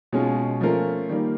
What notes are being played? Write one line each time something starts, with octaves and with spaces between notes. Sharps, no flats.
B2 G#3 C#4 F4
F3 A3 C#4 F4 A#4
D#3 G3 A#3